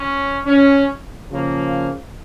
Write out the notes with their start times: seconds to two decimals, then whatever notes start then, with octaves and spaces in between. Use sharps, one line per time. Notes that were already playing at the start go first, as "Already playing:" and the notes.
Already playing: C#4
0.46 C#4
1.30 C#3 F3 A#3